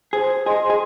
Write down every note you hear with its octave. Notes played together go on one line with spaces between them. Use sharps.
G#4 C5
G#4 D#5 G#5 C6
G#4